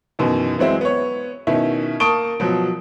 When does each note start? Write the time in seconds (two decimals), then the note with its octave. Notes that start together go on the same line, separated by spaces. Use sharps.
0.19 F#2 B2 D#3 E3
0.58 E3 F#3 G#3 C4 E4
0.81 B3 C#5
1.47 B2 D#3 C#4 E4
2.00 A#3 A5 C#6 D#6 D7 G7
2.40 B2 F3 F#3